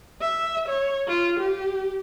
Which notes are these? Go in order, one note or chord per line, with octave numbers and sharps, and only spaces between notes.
E5
C#5
F4
G4